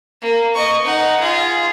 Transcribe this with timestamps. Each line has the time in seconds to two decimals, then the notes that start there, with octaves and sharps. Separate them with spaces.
0.22 A#3
0.55 D#5 C#6
0.85 D#4 F#5
1.20 F4 G#4